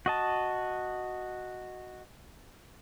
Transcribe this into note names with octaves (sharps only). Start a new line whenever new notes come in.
F#4 D#5 A5